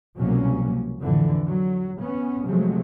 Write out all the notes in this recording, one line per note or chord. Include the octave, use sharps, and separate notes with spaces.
C2 B2 F3 F#3 A#3 C#4
F2 A2 D3 E3
F#3
B3 C#4
C3 F3 F#3 G#3 A3